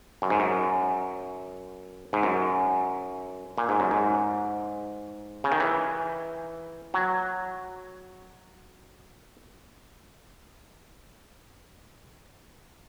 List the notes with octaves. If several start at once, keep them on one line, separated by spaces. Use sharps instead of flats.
F#2
G#2
F#2
G#2
F#2
A#2
G#2
F#2
G#2
C#3
D#3
E3
F#3